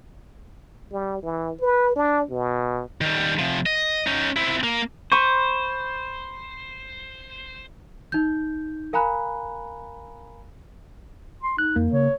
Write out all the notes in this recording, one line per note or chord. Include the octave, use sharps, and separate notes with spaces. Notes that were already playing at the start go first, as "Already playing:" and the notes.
G3
E3
B4
D4
B2
D#3 G3
C3 F3
D#5
C#4 D#4
C4 E4
A#3
C5 B5 C#6 D#7
D#4 G6
A#4 F5 G#5 A#5 B5 F#6
C6
D#4 F#6
F2 A#3
C#3 C#5